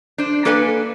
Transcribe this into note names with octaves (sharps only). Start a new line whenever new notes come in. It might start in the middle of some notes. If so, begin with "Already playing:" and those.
D4 C5
A#3 A4 B4 D5 G#5